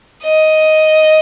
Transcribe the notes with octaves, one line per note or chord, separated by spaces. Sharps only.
D#5